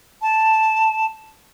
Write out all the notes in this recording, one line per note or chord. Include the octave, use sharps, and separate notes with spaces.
A5